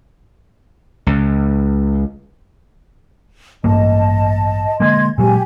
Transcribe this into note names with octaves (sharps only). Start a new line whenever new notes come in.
C#2
A1 G2 A#3 D#5 A5
D3 G#3 A#3 D#5 C6 G#6
A#2 F#3 G#3 G4 G#5